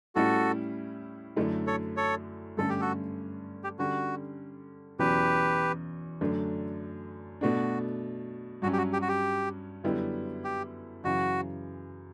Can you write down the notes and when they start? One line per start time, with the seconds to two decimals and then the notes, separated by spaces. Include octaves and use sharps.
0.15 A2 G3 C#4 E4 F#4 A4
1.36 F#2 D3 A3 E4
1.67 A4 C#5
1.97 A4 C#5
2.57 G2 D3 A3 C#4 A4
2.69 G4
2.81 F#4 A4
3.64 G4
3.79 D3 G3 C#4 F#4
4.99 E2 B2 F#3 C#4 E4 G4 B4
6.21 F#2 D3 A3 D4
7.41 B2 A3 D4 F#4
8.62 G2 F#3 C#4 F#4
8.73 G4
8.78 F#4
8.93 G4
9.02 F#4
9.08 G4
9.84 F#2 D3 G3 B3 E4
10.44 G4
11.04 F#2 C#3 E3 F#4